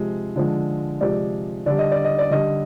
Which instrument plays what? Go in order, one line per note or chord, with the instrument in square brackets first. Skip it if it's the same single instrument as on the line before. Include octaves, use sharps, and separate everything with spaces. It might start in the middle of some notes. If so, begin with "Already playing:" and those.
Already playing: [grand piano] C3 F3 G#3
D3 F3 G#3
C3 F3 G#3 D5
D3 G3 D5
D#5
D5
D#5
D5
D3 G3 D#5